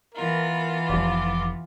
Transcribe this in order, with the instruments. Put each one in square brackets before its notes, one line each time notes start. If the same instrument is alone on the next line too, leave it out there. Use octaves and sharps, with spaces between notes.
[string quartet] E3 B3 F4 [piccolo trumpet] A#4
[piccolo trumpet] A#4
[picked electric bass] F1 F3 [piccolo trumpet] D6